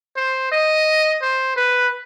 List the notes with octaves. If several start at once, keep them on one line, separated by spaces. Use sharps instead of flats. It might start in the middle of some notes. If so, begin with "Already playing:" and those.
C5
D#5
C5
B4